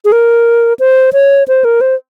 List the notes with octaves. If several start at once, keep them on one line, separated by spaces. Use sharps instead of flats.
G#4
A#4
C5
C#5
C5
A#4
C5